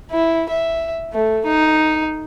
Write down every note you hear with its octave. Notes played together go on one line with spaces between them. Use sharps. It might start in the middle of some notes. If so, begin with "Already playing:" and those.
E4
E5
A3
D#4